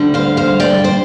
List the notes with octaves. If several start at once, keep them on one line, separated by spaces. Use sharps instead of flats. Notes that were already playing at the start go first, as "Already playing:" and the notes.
Already playing: D2 D3 G3
C5 F5
C5 F5
D5 G5
C5